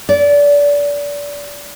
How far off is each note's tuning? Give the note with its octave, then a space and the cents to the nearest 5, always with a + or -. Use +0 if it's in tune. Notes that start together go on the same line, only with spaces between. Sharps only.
D5 -25